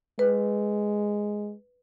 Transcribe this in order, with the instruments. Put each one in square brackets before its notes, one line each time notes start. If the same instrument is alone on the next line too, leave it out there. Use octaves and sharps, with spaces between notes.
[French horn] G#3 [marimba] B4